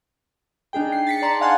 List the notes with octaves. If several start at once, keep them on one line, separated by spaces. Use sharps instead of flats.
D4 D#4 G#4 G5
C7
A6 B6 C#7
D5 A5 A#5 C6
F5 F#5 G#5 C6 F#6